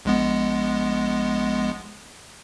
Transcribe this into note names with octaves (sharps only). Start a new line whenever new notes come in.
A#1 G#3 B3